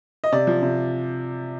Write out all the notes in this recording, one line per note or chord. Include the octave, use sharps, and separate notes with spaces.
D#5
C3 D5
F3
C3